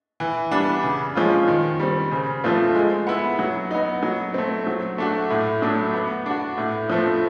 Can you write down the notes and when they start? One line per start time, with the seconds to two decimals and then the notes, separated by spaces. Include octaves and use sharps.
0.20 E3
0.51 G3 B3 D4
0.83 C#3
1.15 F3 G#3 C#4 F4
1.48 D#3
1.79 G3 C4
2.12 C#3
2.44 F3 A3 C4 F4
2.75 G#3
3.07 B3 E4
3.39 F#3
3.71 B3 D#4
4.03 F#3
4.34 A3 C4
4.67 F#3
4.98 A3 D4 F#4
5.30 A2
5.62 F#3 A3 D4
5.94 B3
6.26 D4 F#4
6.58 A2
6.90 F3 A3 C4